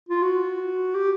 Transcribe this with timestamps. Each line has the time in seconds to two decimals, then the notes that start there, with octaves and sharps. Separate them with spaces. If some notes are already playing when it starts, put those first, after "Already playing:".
0.09 F4
0.23 F#4
0.95 G4